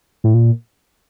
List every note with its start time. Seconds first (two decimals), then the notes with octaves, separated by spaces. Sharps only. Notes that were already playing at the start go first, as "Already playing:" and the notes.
0.24 A2
0.34 A#2